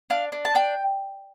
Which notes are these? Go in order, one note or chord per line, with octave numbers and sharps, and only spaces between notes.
D4 F5
D4
A5
D4 G5